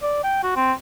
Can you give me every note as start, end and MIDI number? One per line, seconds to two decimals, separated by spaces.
0.02 0.20 74
0.24 0.39 79
0.43 0.55 66
0.56 0.73 60